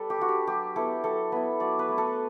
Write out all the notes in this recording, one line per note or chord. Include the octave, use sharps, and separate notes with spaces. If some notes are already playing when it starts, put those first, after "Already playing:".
Already playing: G3 A4 B4
G4
D4 F#4
G4
F#3 G4
B3 E4 A4
F#3 A4
B3 E4 B4
F#3 D5
B4
A3 E4
A4